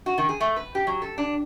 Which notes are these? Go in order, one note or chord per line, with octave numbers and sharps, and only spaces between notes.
F#4
D#3
G#4
A3
B4
G4
F#3
A4
D4